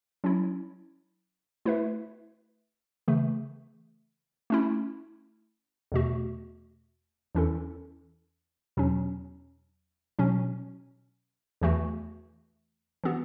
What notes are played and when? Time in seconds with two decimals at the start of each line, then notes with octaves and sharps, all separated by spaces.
0.24 F#3 C#4 E4
1.65 A3 E4 B4 E5
3.08 C#3 E3 A3
4.50 A3 C#4 E4
5.92 E2 B2 A3 F#4
7.35 E2 E3 C#4 E4 A4
8.77 E2 B2 F#3 C#4
10.19 B2 F#3 C#4
11.61 E2 E3 A3 F#4
13.04 E3 B3 F#4